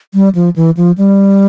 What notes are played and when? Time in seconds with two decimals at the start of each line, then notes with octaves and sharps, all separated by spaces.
0.14 G3
0.35 F3
0.56 E3
0.77 F3
0.98 G3